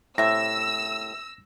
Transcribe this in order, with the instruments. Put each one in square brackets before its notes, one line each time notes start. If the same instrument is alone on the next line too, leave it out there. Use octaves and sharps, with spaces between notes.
[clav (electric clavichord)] A2 [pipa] C3 E5 [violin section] E6 [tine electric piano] A#6